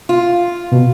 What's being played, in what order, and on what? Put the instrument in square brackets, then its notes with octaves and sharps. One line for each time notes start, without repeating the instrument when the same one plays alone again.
[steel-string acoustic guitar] F4
[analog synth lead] B2